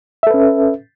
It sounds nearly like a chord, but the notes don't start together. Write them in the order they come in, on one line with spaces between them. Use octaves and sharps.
E5 A4 B4 C#4